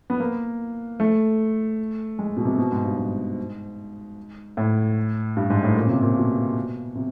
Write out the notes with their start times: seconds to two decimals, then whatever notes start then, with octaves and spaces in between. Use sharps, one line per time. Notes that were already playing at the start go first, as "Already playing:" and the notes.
0.10 B3
0.20 A#3
1.00 A3
2.19 G#3
2.37 B2
2.45 C3
2.58 B2
2.72 G#2
2.85 G2
2.98 G#2
4.57 A2
5.37 G2
5.50 G#2
5.63 A2
5.76 A#2
5.85 C#3
5.89 C3
6.03 A#2
6.16 B2
6.95 C3